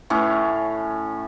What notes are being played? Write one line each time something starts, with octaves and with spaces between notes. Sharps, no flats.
A2 C#4